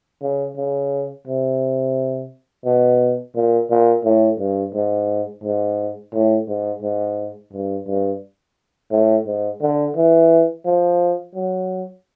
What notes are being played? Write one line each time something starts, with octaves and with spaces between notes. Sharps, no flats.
C#3
C#3
C3
B2
A#2
A#2
A2
G2
G#2
G#2
A2
G#2
G#2
G2
G2
A2
G#2
D3
E3
F3
F#3